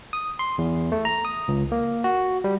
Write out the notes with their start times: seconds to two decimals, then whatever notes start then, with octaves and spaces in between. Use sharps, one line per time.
0.13 D#6
0.39 C6
0.58 E2
0.92 A3
1.05 A#5
1.25 D#6
1.48 C#2
1.72 A#3
2.04 F#4
2.44 G3